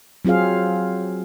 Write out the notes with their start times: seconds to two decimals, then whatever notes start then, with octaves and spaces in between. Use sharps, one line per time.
0.25 F#3 C4 F4 G#4 F5